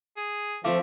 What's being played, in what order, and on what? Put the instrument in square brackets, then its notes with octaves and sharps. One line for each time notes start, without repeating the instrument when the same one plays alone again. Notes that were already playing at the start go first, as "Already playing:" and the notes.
[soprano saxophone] G#4
[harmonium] F3 [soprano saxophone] A3 [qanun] C4 F4 E5 [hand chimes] F5 D6